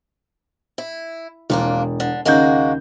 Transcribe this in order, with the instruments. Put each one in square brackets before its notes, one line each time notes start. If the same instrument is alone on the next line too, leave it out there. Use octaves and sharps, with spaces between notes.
[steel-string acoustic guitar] E4
[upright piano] E1 [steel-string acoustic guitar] F2 A#3 D4
[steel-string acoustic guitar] D3
[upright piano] D#2 C#3 G6 [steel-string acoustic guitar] G#3 A#3 F#4